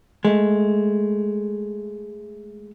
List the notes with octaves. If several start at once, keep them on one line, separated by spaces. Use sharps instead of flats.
G#3 A3